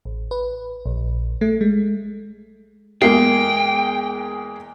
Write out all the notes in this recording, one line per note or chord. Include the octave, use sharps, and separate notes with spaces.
A1
B4
A#1
A3
G#3
E2 G#3 A#3 G#4 G5 C7